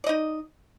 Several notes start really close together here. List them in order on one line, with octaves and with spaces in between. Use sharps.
D5 D#5 D#4